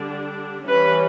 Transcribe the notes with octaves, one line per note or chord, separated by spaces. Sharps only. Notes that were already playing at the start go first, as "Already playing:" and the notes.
Already playing: D3 G3 D4
E3 G3 C#4 B4